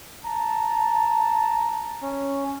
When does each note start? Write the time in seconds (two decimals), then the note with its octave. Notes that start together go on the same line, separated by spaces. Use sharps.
0.25 A5 A#5
2.02 C#4